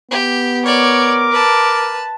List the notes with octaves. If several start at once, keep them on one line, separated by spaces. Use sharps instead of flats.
B3 G4
A#4 C#5 D5 D6
B4 A5